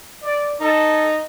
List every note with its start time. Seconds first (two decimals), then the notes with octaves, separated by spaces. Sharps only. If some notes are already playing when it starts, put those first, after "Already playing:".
0.22 D5
0.61 D#4 A4